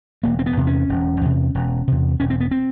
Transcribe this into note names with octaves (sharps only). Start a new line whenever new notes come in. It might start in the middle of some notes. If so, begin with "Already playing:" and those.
E1 A#3
C4
B3
E2 C3
C#4
E1
E2 C3
E1
E2 C3
E1 C#4
C4
B3
C4